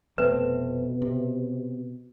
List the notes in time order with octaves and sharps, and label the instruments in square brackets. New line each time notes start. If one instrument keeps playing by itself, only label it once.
[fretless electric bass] F1 A3 C4 [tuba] B2 [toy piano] B4
[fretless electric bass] C3